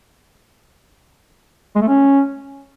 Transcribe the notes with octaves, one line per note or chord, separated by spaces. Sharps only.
G#3
A3
C#4